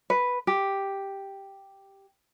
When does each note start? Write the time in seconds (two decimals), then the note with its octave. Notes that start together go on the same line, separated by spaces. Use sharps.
0.10 B4
0.47 G4